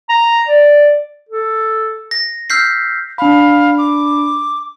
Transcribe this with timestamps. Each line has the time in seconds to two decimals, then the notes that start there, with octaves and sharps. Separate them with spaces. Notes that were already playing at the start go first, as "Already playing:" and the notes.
0.09 A#5
0.48 D5
1.29 A4
2.11 A#6
2.50 E6 F6 G6 B6 C7
3.18 D4 F5 B5
3.78 D6